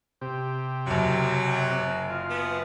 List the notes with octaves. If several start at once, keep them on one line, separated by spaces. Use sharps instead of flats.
C3 G4
F#1 F#2 F#3
F4
B3